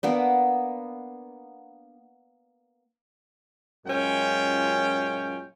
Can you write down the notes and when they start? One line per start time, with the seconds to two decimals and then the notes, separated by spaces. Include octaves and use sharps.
0.03 A#3 B3 D4
3.86 F#2 A#2 G#3 C#4 F4 G5